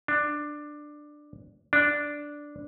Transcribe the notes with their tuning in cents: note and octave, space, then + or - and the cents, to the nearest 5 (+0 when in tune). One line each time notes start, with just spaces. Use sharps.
D4 +10
D4 -5